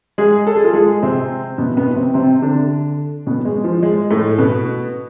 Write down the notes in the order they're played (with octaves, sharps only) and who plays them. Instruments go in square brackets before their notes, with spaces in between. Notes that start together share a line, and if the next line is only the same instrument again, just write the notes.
[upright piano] G#3 G#4
A4
G#4
F4
G#3 G#4
C3 C4
B2 B3
B2 B3
C3 C4
C3 C4
D3 D4
B2 B3
G#3
F3
G#3
A2 A3
B2 B3